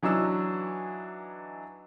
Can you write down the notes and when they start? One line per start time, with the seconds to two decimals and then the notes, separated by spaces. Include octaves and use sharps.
0.03 E3 F#3 D4 D#4 E6